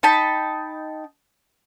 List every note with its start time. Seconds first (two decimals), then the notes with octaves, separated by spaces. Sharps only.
0.03 D#4 G5 A5 B5